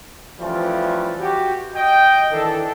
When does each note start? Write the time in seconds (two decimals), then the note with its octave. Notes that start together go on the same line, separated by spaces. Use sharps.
0.39 E3 F3 G3 A3 C#4 F4
1.20 F#4 G4
1.75 D#5 G5
2.31 D#3 E3 D4 A4